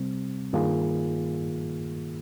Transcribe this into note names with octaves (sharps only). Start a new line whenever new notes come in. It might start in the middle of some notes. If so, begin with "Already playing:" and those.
Already playing: C3 G3 C4
G2 D#3 A#3 F4 G#4